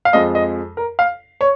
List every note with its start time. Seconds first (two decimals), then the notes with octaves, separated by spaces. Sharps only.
0.05 F5
0.13 F2 F3 G#3 D#5
0.35 D#5
0.77 A#4
0.99 F5
1.41 C#5